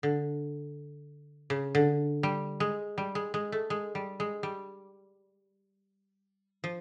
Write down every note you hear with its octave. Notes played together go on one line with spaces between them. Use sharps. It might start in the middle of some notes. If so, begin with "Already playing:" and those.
D3
C#3
D3
G3
G#3
G3
G#3
G#3
A3
G#3
G3
G#3
G3
F3